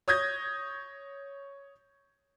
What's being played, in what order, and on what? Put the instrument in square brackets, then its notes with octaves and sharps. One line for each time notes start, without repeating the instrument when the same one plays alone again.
[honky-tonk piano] C#5 D#6 G6 G#6 A#6